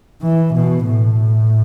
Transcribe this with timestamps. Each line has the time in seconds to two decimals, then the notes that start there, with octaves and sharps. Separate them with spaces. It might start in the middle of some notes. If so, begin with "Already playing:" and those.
0.22 E3
0.55 B2
0.87 A2